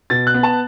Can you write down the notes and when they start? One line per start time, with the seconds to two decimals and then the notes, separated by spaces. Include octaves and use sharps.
0.10 B2 A6
0.27 F#6
0.34 B3
0.43 A5